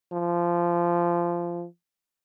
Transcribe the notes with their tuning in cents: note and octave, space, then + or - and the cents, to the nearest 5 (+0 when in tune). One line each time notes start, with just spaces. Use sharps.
F3 -15